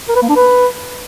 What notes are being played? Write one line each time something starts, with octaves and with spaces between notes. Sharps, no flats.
A#4
B4
A#3
D4
B4